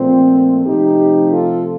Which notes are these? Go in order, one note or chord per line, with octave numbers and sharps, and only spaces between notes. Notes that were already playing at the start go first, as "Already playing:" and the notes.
Already playing: A#2 F3 A3 C4
C3 F3 A3 D#4 G4
F4 A4